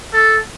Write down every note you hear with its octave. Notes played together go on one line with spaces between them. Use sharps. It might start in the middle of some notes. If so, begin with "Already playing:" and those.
A4